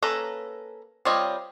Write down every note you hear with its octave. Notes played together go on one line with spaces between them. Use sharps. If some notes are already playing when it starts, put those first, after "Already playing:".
A#3 C#4 A4 B4 A#5
G3 C4 F4 C#5 D#5